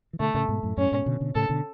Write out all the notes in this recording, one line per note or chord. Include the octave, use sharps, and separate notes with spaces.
E3
B2 D3 A3
A2 C#3
G#2 B2
F#2 A2
F#2 A2 C#4
G#2 B2
B2 D3
B2 D3
A2 C#3 A4
B2 D3